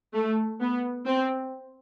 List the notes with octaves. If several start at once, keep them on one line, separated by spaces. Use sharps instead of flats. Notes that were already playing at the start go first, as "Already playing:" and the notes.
A3
B3
C4